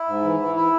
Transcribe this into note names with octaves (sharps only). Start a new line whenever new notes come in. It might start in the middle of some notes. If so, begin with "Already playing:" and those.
Already playing: E4
G#2
E3
E3
E4